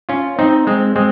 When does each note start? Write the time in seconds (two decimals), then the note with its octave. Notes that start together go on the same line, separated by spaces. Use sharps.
0.09 C#4 F4
0.39 C4 D#4
0.67 G#3 C4
0.96 G#3 C4